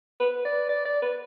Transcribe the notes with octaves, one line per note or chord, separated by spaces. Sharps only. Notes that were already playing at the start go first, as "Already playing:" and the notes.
B4
D5
D5
D5
B4